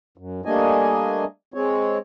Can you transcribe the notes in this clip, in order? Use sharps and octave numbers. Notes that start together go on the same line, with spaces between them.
F#2
G3 A3 A#3 D4 D#5 G#5
G#3 C4 C#5